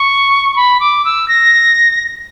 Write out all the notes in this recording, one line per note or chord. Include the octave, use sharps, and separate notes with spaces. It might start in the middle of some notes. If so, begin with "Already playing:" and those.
Already playing: C#6
C#6
B5
D6
E6
A#6